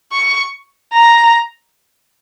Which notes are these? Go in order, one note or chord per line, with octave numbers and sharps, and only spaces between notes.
C#6
A#5